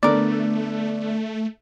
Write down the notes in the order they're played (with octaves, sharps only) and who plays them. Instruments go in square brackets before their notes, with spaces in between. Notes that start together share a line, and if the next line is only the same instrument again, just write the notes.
[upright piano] D3 B3 [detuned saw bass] A3 [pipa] A#4 D5